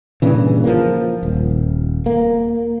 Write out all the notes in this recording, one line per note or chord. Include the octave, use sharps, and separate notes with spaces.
G2 A#2 C#3 E3
F3 A#3
D#1
A#3